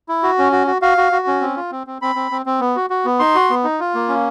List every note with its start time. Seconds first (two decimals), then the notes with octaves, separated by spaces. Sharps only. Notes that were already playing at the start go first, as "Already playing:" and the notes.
0.09 E4
0.23 F#4
0.39 C#4
0.52 F#4
0.67 F#4
0.82 F#4 F5
0.98 F#4
1.12 F#4
1.27 C#4
1.41 C4
1.56 F4
1.72 C4
1.87 C4
2.02 C4 B5
2.15 C4
2.31 C4
2.46 C4
2.60 B3
2.76 F#4
2.90 F#4
3.05 B3
3.19 D#4 C6
3.35 F#4
3.50 B3
3.64 D#4
3.80 F4
3.95 A#3
4.09 C#4